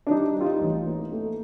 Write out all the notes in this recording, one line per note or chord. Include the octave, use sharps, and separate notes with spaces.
D4
G3 D#4
G3 F4
D#4
A1
A#3
A3